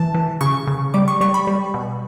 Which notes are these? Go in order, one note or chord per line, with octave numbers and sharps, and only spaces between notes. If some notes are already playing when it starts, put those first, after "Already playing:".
Already playing: E3 A5
E3
C#3 C#6
C#3
G3 D6
C#6
G3 C#6
B5
G3
B2